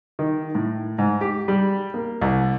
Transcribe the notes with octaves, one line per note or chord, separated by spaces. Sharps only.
D#3
A2
G#2
G4
G3
A#3
C2